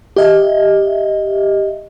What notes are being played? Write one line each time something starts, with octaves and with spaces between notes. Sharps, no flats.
G4 D#5 E5